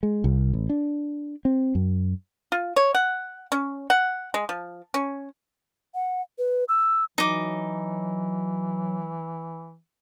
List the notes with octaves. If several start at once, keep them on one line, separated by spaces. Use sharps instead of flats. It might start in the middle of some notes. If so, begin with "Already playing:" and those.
G#3
C2
A1
D4
C4
F#2
F4
C#5
F#5
C#4
F#5
G#3
F3
C#4
F#5
B4
E6
E3 F#3 D#4 D6